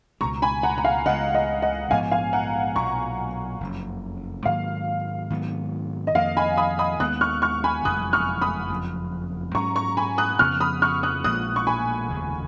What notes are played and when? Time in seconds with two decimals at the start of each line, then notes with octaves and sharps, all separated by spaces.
0.21 C#2 B2 G#3 A#5 C#6
0.42 G#5 B5
0.63 F#5 A#5
0.78 A#5
0.84 F5 G#5
1.06 C#2 C#3 G#3 D#5 F#5
1.35 D#5
1.62 D#5 F#5
1.91 A#1 G#2 F3 B3 F5 G#5
2.12 F5 G#5
2.33 F#5 A#5
2.76 B1 A#2 F#3 A#5 C#6
3.60 F#1 F2 C#3
4.45 G#2 D#3 F#3 A#3 F5
5.30 G#2 D#3 F#3 B3
6.07 D#5
6.15 F2 D#3 A#3 F5
6.37 G#5 B5
6.57 B5 D#6
6.79 B5 D#6
7.00 D#2 D#3 G#3 B3 D#6 F#6
7.21 C#6 F6
7.42 C#6 F6
7.64 G#5 B5
7.85 F#1 F2 F3 G#3 D#6 F#6
8.13 C#6 F6
8.41 B5 D#6
8.69 F#1 F2 F3
9.55 G#2 F#3 C#4 A#5 C#6
9.76 A#5 C#6
9.97 G#5 B5
10.18 D#6 F#6
10.39 F2 C#3 F3 B3 C#6 F6
10.60 B5 D#6
10.82 C#6 F6
11.03 D#6 F#6
11.24 A#1 A#2 F3 G#3 D#6 F#6
11.56 C#6
11.67 G#5 B5
12.09 F1 D#2 C#3